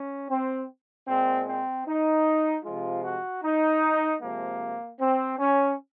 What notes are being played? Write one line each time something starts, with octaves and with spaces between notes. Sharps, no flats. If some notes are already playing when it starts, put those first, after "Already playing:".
Already playing: C#4
C4
A#2 G#3 C4
C4
D#4
C3 F3 G#3 F4
F#4
D#4
C3 F3 G#3 A#3
C4
C#4